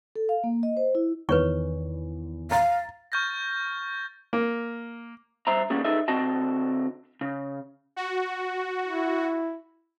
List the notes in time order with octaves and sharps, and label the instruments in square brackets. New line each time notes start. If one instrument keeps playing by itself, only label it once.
[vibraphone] A4
F5
A#3
D#5
C5
E4
[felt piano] E2 [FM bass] D#3 [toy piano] B4 C#5 C#6
[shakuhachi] F5 [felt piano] A#5 A6
[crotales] C#6 F6 G6 A6 A#6
[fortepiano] A#3
[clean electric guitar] G2 C5 E5 A#5
G3 A#3 B3 C#4 G#4
D#4 G#4 A4 B4 D#5 E5
D3 C4 F#4 D#5 A5
C#3
[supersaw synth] F#4
[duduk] E4